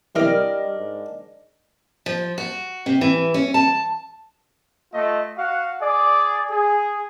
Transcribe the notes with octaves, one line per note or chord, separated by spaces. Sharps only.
C2 E3 G3 D4 A#4 D#5 F6
G#2
F3
F#4
C3
E3
C#4
A5
A3 F4 D#5
F#4 F5 F#5
G#4 D5
G#4